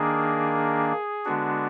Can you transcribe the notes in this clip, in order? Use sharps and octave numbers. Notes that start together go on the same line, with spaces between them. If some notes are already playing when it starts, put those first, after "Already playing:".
Already playing: D#3 A#3 D4 G#4
D3 G#3 B3 D4 F#4